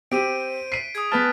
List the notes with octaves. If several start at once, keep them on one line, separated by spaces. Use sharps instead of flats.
C4 G4 C5 D7 D#7
B6 C7 D#7
G#4 D#6 G#6
B3 B4 A5 F6